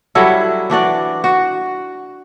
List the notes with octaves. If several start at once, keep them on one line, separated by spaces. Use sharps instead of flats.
F#3 G3 E4 A4
E3 D4 F#4 D5
F#4